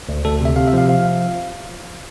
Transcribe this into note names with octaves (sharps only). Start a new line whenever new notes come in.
D2
D2 A4
C3 E5
C3 F5
E5
F3 F5
F3 F5